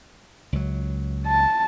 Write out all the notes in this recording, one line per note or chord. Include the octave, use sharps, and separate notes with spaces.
C#2 F#3
A5